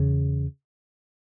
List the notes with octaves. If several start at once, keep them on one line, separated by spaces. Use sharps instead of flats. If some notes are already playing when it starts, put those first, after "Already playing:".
Already playing: E2 C#3